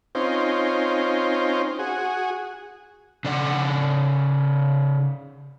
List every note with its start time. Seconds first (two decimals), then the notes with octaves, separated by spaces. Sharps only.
0.15 C4 C#4 D#4 F4 C5
1.79 F#4 G#4
3.25 C#3 D5 F#5